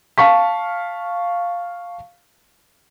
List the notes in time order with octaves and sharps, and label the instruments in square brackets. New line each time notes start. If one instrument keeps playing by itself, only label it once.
[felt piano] F5 A5 C#6 B6